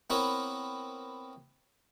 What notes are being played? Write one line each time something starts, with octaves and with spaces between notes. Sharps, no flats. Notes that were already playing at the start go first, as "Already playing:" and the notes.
B3 C4 E4 A#4 B4 C#5